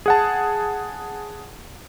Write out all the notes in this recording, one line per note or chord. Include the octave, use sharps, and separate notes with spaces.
G#4 F#5 A5